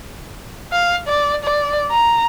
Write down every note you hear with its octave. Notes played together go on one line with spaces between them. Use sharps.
F5
D5
D5
A#5